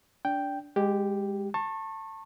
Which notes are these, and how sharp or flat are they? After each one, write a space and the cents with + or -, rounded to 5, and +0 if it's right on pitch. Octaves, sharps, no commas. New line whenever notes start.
D4 -20 G5 +0
G#3 -25 G4 +0
A5 +20 C#6 -30